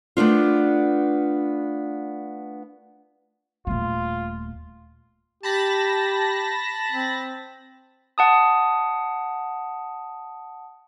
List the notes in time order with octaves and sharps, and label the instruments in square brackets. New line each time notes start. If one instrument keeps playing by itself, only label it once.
[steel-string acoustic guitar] A3 B3 D4 F4
[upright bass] D#1 A3 [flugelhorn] F4
[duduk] G4 [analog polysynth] A5 B5 A#6
[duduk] C4
[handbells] F#5 A5 D#6